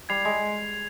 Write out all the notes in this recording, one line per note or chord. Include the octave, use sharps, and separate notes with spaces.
G3 G#6 C7 F7
G#3